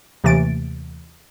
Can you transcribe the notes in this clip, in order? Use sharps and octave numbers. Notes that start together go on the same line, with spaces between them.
D#2 C3 E3 A3 A6 D7